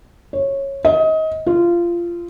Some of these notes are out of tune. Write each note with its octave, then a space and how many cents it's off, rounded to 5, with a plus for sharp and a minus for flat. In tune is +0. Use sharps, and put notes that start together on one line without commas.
C#5 -15
D#5 +25
F4 -20